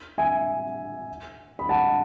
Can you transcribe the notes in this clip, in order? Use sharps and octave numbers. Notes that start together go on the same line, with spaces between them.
E5 G#5
B5
F#5 A5